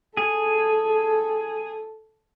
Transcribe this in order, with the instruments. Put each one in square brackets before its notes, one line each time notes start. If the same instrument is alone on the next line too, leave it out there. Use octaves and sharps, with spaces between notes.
[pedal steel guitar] G#4 [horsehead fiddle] A4